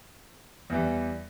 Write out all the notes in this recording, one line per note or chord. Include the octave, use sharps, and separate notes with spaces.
E2 E3 G3